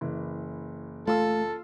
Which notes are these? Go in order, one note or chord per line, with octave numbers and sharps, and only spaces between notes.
F#1 E3
A3 F4 A4 E6